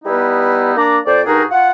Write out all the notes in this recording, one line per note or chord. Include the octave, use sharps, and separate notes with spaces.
G3 B3 D#4 E4 B4
A#3 D4 D5 A#5 D6
F2 C5 D5
G2 D#4 F#4 G#4 A#4
F4 F#5